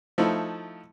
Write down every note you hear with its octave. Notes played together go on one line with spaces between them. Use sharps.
F3 A3 D#4 E4